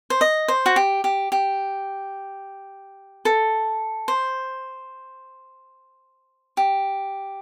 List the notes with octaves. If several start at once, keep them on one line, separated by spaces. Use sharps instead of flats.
C5
D#5
C5
F#4
G4
G4
G4
A4
C5
G4